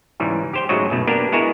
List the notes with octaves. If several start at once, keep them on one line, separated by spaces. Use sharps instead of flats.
G#2 C#3 E3 G3
G4 C5 G5
G#2 C#3 F#3 A3 F#4 D#5
F#2 B2 A3
A#3 B3 D4 G4 A#4
G#3 B3 E4 F#4 G#4 A#4